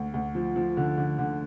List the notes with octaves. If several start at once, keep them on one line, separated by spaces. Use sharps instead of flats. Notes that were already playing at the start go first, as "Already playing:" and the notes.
Already playing: D2
D2
F3
F3
D3
D3
D3